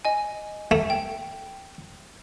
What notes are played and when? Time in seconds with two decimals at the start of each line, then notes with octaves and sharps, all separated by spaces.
0.05 D#5 G#5
0.71 A3
0.90 G5